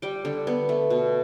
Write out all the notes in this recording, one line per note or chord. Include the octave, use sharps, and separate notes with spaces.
G3 G5
D3
B3
A3
B2